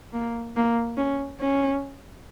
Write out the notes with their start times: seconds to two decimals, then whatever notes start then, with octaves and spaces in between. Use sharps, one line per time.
0.13 A#3
0.56 A#3
0.98 C#4
1.41 C#4